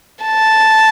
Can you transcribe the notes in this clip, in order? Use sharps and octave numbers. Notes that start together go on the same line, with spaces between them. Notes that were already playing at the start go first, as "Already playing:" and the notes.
A5